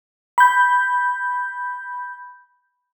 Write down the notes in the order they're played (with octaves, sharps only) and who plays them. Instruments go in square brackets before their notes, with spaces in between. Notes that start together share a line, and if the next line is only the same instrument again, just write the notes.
[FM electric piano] B5 G6